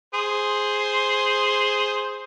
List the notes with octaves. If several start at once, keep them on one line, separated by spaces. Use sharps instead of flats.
G#4 C5